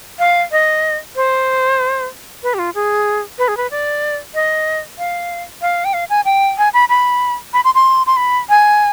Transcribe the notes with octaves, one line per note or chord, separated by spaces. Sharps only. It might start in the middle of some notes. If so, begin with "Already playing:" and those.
F5
D#5
C5
B4
G4
F4
G#4
B4
G#4
B4
D5
D#5
F5
F5
G5
F5
G#5
G5
G#5
B5
B5
B5
C6
C6
C6
B5
G#5